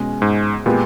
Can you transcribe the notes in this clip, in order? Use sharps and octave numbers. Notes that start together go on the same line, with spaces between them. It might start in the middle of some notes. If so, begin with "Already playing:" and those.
Already playing: B2 G#3 C#4 G#4
G#2
A#2 G#3 B3 G4